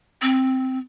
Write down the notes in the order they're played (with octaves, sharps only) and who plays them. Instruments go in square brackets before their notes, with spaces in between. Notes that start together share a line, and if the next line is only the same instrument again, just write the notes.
[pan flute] C4